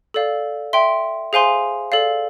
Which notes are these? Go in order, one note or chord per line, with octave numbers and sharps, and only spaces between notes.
A4 D5 F5
E5 G5 C6
G#4 C5 F5 G#5 C6
A4 D5 F5